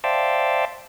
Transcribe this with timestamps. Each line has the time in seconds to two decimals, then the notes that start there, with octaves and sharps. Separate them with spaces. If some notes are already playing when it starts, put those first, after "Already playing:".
0.04 C5 D5 E5 F5 G5 A5